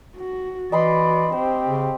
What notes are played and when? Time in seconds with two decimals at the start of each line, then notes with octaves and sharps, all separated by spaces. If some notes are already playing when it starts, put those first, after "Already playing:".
0.16 F#4
0.72 E3 F#4 D5 D#5 B5 C6
1.32 C4 G4 C5
1.67 C#3